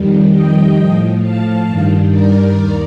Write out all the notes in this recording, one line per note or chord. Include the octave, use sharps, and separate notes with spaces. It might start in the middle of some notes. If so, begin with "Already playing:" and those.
Already playing: F2 D#3 G3
D#5 G5
A2 F3
F5 A5
G2 D#3 G3
A#4 D5
D#2 D#3